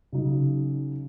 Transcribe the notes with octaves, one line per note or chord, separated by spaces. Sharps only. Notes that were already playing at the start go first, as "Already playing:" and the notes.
C#3 F#3 D#4